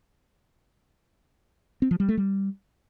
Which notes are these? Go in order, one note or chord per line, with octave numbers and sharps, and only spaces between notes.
C4
F3
G3
A3
G3